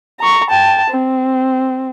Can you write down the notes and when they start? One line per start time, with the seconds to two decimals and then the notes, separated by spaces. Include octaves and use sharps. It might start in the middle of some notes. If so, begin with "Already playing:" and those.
0.20 A#5 C#6
0.50 G5 A5
0.91 C4